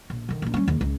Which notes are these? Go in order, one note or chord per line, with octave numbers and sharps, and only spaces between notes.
A#1
D3 D#3
A#1 D4
G3 C#4
D#2 C#3
C#2